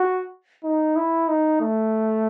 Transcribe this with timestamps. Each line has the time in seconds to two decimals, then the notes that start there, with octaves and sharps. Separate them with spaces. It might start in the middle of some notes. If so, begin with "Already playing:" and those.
Already playing: F#4
0.64 D#4
0.96 E4
1.29 D#4
1.61 A3